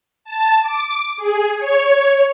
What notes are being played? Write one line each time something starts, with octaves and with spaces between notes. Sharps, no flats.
A5
D6
G#4
C#5